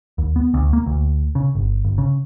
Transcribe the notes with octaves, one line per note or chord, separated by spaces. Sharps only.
D#2
B3
D2
A#3
D2
C#3
G1
G1
C#3